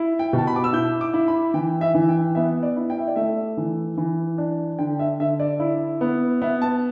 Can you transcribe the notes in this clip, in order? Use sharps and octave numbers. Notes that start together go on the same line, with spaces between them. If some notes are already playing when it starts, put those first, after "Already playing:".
Already playing: E4
G5
B2
A5
B5
D6
E6
E4 G6
D6
E4
B5
E3 G5
E5
E3
G5
B3 E5
D5
E4
G5
E5
D5
A3 E5
E3
E3
D4
D3 G5
E5
D3 E5
D5
E4
B3
B3 E5
A5